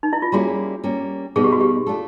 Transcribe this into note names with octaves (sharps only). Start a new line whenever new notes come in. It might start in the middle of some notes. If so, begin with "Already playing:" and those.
D#4
E4
F4
G3 A#3 C#4 E4 F#4 G#4
G3 A#3 C#4
B2 G3 B3 D#4 G#4
G4
F#4
G4
A3 D4 F4 A4